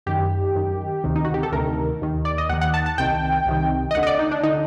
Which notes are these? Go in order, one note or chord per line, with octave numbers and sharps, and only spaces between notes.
F#2 D#3 G4
F#2 D#3
D2 C3 D#3
D#4
F#4
G4
A4
D2 C3 D#3 A#4
D#2 D#3
D5
D#5
D#2 D#3 F#5
F#5
A5
A5
C2 C3 D#3 G5
C2 C3 D#3
D#5
D2 D3 F#5
D#5
D5
D#4
D4
D3 D#4